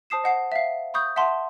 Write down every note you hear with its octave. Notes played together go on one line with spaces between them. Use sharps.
C5 A5 D#6 C7 E7
D#5 F#5 C7
E5 F5
B5 C#6 D#6 G6
E5 F#5 A5 C6